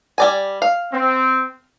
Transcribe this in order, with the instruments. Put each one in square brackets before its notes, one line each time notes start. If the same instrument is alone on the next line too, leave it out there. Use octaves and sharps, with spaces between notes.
[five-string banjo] G3 D5 G#5
F5
[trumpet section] C4